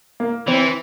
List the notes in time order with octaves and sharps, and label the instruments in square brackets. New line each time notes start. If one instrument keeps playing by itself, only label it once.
[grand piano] A#3
[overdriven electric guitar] E3 [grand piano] C4